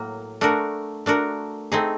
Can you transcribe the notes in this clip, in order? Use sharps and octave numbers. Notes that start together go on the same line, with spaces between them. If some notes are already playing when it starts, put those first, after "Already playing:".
Already playing: A2 F#3 A#3
A3 D4 F#4 A#4
A3 D4 F#4 A#4
A3 C4 D#4 G#4